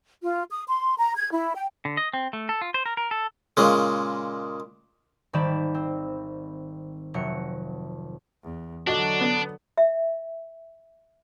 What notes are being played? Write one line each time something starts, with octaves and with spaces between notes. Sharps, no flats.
F4
D#6
C6
A#5
G#6
E4
G5
D3
D#5
C4
A3
A4
F4
C5
A#4
A#4
A4
A#2 C#3 G#3
G#1 D#3 G3 D5 B5 E7
C4
F1 F#3 C#7
E2
D3 F#3 D4 F#4 D#5 F#7
B3
E5